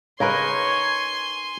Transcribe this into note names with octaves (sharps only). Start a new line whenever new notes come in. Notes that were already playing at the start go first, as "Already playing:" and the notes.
C#3 D#4 A#4 B4 C#5 G#5 C6